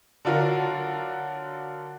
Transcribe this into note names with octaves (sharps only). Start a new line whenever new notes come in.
D3 F#3 D4 F4 F#4 A#4